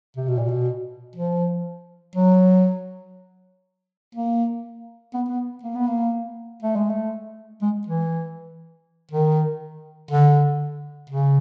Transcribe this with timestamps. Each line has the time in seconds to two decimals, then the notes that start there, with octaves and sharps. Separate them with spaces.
0.17 C3
0.28 B2
0.38 A#2
0.49 B2
1.16 F3
2.16 F#3
4.15 A#3
5.14 B3
5.29 B3
5.63 A#3
5.75 B3
5.87 A#3
6.63 A3
6.76 G#3
6.90 A3
7.62 G#3
7.87 E3
9.12 D#3
10.11 D3
11.10 C#3